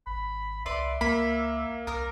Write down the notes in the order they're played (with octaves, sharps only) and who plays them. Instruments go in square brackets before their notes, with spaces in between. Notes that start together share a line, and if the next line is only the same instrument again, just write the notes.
[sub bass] G#1 [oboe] B5
[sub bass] C2 [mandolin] B4 D5 C6 [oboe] E5
[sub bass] C#2 [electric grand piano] A#3 [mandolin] B5
[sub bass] C2 [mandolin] A#4 F6 [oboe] D#6